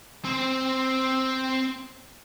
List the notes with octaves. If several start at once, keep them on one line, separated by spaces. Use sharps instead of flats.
C4 C5